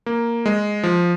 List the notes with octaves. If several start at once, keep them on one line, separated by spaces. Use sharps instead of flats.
A#3
G#3
F3